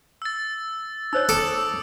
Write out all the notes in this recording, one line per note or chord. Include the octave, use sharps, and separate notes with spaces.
E6 A6
D#4 C5 C#5 E6
A4 D6 D#6 D7